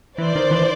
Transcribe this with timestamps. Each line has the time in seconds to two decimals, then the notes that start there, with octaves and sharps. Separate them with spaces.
0.18 E3 C5 D5
0.35 D#3
0.51 E3